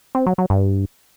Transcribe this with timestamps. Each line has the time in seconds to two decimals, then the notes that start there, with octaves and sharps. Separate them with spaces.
0.15 C4
0.27 F#3
0.38 F#3
0.50 G2